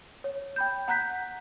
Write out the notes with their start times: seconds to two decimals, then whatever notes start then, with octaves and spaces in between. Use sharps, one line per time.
0.24 C#5
0.56 G5 B5 G6
0.88 F#5 A#5 F#6 G6 B6